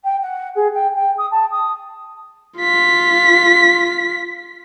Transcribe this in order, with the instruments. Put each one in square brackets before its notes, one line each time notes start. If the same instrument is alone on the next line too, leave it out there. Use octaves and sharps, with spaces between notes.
[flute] G5
F#5
G#4
G5
G5
D#6
A5
D#6
[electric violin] F4 B6